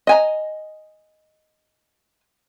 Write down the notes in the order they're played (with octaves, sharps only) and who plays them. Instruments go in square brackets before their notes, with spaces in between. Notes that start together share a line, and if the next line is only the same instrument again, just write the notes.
[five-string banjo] D#5 G#5 A#5